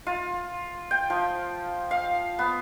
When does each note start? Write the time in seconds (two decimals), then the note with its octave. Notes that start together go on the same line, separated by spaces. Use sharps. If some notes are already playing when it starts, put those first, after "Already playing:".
0.07 F4
0.91 G5
1.10 F3
1.91 F5
2.39 B3